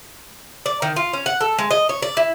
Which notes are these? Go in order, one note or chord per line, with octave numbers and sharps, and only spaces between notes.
D5
D#3
F4
C#4
F#5
A4
G#3
D#5
C#5
D5
E4